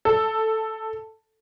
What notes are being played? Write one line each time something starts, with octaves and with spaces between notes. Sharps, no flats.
A4